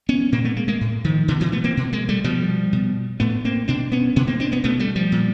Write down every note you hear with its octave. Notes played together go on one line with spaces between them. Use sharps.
B3 C#4
A#2 A#3 C4
A3 B3
G#3 A#3
G#3 A#3
A2
D#3 F3
B2 D3 E3
E3 F#3
A3 B3
A#3 C4
B2
G#3 A#3
G3 A3
B2 F3 G3
B2
A2 A3 B3
A#3 C4
B2 C4 D4
B3 C#4
B2 B3 C#4
A#3 C4
C4 D4
B3 C#4
B2 A3 B3
G3 A3
F3 G3
A#2